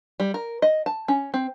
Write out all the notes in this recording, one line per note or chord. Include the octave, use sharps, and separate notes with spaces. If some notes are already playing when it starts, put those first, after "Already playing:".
G3
A#4
D#5
A5
C#4
C4